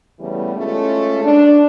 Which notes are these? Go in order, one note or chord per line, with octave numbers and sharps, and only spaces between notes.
C#3 E3 G3 A3 B3
G#3 A3 C#4 F4 A4
D4